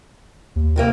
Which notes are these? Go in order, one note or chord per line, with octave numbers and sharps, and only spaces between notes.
D#2
D2 C3 A#3